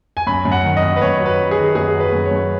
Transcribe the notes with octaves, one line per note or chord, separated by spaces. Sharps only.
G#5
F#2 B5
F#2
F#5
D#3
D#5
F#2
B4
F#2 C#5
F#3
B4
F#3
G#4
D#3
F#2 G#4
F#3
B4
F#2
C#5
F#2